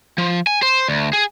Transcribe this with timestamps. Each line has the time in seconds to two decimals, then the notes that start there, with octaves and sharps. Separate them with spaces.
0.18 F3
0.47 G#5
0.63 C5
0.88 D2
1.13 G#4